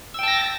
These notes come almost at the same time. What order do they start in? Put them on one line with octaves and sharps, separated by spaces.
E6 G5 A5 A#6